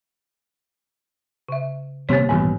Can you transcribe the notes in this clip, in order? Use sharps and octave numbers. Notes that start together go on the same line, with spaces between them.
C#3 E5
D#1 C3 A#3 C4 G4 C#5
D#1 B1 G#2 E3